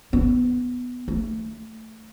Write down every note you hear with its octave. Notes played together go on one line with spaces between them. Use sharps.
B3
A3